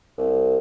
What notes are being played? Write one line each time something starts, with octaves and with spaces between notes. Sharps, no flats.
C2